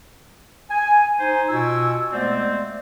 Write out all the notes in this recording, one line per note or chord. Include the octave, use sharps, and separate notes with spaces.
G#5
D#4 C5 G#5
B2 F4 F#4 G#5 E6
G#3 A3 B3 C4 C5 D5